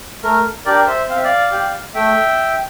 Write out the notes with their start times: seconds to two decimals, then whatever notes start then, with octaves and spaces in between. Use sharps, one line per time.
0.23 A3 A#4
0.66 D4 G4 A#4 D5
0.87 C5 E5
1.08 C4 F5
1.16 E5
1.24 D5 F5
1.51 G4
1.94 A3 E5 G5